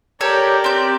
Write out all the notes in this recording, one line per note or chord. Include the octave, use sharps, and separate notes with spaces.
G4 A4 A#4 C#5 D5
C4 G6